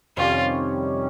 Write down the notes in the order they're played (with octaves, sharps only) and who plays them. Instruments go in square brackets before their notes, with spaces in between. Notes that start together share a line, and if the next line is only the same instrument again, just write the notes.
[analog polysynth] F2 C3 D#3 G3 C#4 [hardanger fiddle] F4